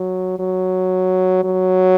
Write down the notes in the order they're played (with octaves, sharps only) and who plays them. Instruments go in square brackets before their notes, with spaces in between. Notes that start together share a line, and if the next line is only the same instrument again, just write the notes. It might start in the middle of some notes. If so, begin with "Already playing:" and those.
Already playing: [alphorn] F#3
F#3
F#3